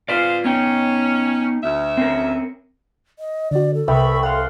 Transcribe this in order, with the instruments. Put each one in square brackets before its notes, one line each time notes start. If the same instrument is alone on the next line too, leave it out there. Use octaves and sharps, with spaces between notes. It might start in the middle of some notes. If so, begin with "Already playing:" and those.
[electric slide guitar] F4 B4 D5 [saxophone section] G#4 C5 F5
[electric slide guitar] B3 D#4 G5 [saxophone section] C#4
[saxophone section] D2 E5
[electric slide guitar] C4 C#4 A#4
[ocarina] D#5
[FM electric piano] D3 F#4 [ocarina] D5
[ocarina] A4
[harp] C2 [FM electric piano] B4 E5 G5 [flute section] B5 C#6 E6
[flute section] F5 C6 [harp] F#5 F6